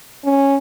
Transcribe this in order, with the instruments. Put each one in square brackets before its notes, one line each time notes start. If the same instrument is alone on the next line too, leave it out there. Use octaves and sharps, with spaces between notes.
[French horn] C#4